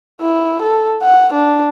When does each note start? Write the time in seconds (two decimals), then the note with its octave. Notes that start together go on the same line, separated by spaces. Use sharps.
0.21 E4
0.62 A4
1.03 F#5
1.34 D4